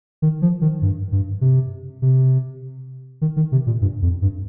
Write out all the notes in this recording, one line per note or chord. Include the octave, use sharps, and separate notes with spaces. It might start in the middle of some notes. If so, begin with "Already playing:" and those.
D#3
F3
D#3
G2
G2
C3
C3
D#3
D#3
C3
A#2
G2
F2
G2